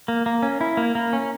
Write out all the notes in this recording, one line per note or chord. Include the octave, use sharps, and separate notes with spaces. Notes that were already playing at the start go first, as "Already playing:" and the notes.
A#3
A#3
C#4
E4
A#3
A#3
C#4